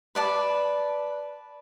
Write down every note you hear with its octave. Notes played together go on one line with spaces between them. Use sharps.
B4 D5 A5